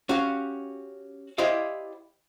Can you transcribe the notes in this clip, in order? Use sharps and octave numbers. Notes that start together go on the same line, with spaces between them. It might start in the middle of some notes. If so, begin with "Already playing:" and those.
C#4 F#4 G4 F5
E4 G4 C5 D5 D#5 F5